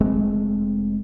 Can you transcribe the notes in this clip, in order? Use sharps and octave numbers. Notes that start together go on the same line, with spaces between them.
F1 G#3 A3 C4